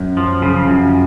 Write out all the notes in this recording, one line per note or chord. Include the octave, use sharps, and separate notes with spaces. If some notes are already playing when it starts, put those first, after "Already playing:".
Already playing: F#2
F3
C#3
F#2